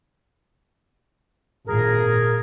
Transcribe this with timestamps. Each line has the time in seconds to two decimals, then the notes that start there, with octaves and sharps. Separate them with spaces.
1.67 G#1 A#2 G#4 A#4